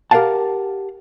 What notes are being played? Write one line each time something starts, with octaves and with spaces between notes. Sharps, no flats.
G4 A#4 C5 F5 F#5 A5